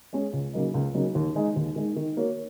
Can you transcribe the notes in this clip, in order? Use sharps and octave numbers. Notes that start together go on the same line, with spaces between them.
G#3 C#4 G#4
C#2
C#3 F#3 A#3 D#4
C#2
C#3 F#3 A#3 D#4
D#2
D#3 G#3 D#4
D#2
D#3 G#3 D#4
D#3
A#3 F#4 C#5